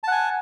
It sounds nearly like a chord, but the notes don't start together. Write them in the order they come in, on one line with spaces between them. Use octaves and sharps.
A5 F#5 G#5